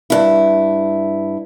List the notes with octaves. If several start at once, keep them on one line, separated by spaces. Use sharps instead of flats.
G2 E4